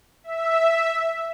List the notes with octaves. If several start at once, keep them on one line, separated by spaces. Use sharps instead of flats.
E5